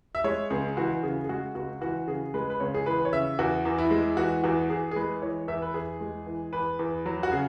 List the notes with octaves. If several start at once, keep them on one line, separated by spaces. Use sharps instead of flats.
E5
G#3 C#5
C#2 G#4
E3 F#4
C#3 G#4
G#4
G#3 F#4
C#2 F#4
E3 F#4
C#3 G#4
G#3 B4
B4
C#2 C#5
G#4
E3 B4
C#5
C#3 E5
E2 F#4
E2
E4
G#3
E3 F#4
E2 F#4
E2 G#4
G#4
G#3 B4
E3 C#5
E2 E5
B4
E2 G#4
G#3
E3
E2 B4
E2
F#3
F#4
C#3 G#4